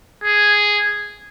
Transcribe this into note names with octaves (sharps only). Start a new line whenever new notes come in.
G#4